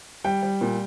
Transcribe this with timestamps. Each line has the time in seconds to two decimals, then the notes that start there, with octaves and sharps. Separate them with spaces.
0.24 G3 G5
0.43 G3
0.61 A#2